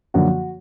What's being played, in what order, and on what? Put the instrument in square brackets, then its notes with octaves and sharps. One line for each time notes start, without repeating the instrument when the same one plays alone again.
[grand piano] F#2 D3 F3 A#3 F#4